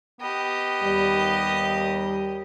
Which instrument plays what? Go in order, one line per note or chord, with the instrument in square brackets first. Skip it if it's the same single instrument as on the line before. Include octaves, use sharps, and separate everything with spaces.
[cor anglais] B3 [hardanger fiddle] G4 D#5
[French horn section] D#2 G3